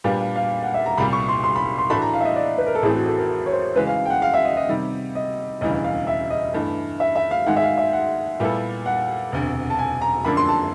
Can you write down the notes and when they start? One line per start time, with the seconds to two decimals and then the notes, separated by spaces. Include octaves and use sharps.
0.04 A#2 G3 B3 D4 G4 F5
0.20 F5
0.36 F5
0.63 F#5
0.74 E5
0.86 A#5
0.97 C2 A#2 G3 B5
1.13 C#6
1.29 C6
1.44 C6
1.56 B5
1.78 C6
1.90 A2 E3 A3 D4 F#4 B5
2.02 A#5
2.13 F5
2.21 E5
2.25 D#5
2.36 D5
2.58 B4
2.66 A#4
2.75 A4
2.83 A1 A2 E3 A3 C4 G#4
2.95 F#4
3.06 A4
3.18 A#4
3.46 C#5
3.52 C5
3.75 C#3 E3 G#3 B4
3.87 F5
4.05 G5
4.10 F#5
4.22 F5
4.34 E5
4.45 D#5
4.57 D#5
4.69 C3 D#3 G3
5.15 D#5
5.61 E1 D2 C#3 E3 G3 D#5
5.84 F5
6.07 E5
6.30 D#5
6.54 G2 E3 A3
7.00 E5
7.16 E5
7.31 F5
7.46 G#2 D#3 G#3 F#5
7.56 E5
7.62 F5
7.78 E5
7.93 F#5
8.40 A#2 G3 B3 E4 A4
8.86 F#5
9.32 E1 D2 C3
9.70 A5
9.79 G#5
10.02 A#5
10.25 F#2 D3 F3 A#3 D4 B5
10.37 C6
10.49 A5